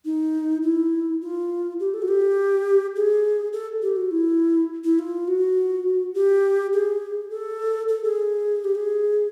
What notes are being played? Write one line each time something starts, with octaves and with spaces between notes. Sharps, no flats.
D#4
E4
F4
G4
A4
F#4
G4
G#4
A4
G4
F#4
E4
E4
F4
F#4
G4
G#4
A4
A4
G#4
G4
G#4